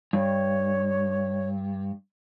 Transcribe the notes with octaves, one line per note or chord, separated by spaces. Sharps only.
G2 C#5